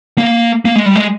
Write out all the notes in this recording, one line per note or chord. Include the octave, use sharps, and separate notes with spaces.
A#3
A#3
G#3
G3
G#3